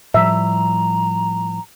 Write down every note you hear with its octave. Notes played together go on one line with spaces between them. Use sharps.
A2 F3 G3 E5 A#5